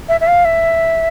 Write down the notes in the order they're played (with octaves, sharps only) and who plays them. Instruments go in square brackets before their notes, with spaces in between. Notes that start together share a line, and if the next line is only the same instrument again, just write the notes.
[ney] E5
E5
F5
E5